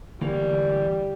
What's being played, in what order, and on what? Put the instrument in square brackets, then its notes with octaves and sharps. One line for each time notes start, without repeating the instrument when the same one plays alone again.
[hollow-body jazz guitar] D2 E3 A#3 [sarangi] G3